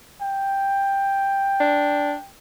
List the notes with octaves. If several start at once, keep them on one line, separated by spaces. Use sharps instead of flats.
G5
D4